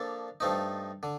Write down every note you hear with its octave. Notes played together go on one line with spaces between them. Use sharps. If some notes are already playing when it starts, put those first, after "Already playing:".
Already playing: F3 A#3 D4 A4
G2 F3 A3 D#4
D3